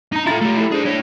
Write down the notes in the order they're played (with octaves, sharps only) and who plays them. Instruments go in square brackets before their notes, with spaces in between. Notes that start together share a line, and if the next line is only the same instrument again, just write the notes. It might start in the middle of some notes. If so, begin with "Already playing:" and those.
[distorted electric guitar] D#4 A#5
[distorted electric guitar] E4 A4 [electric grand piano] F4 A#5 A6
[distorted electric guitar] A3 G4
[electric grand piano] E4 A4
[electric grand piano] D4 [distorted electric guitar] G#4 C5
[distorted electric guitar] E4 C#5